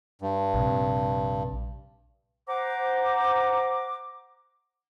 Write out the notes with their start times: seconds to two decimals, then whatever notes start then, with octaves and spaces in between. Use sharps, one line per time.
0.22 G2
0.54 A#1 C3
2.48 C5 F#5 A#5 D6